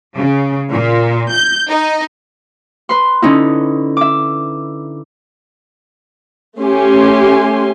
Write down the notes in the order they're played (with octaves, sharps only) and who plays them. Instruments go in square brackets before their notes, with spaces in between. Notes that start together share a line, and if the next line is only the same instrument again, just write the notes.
[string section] C#3
A#2
G6
D#4
[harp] B4 C6
D3 C#4 D#4 E4
E5 D6
[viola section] A3 C#4 G4 G#5 C6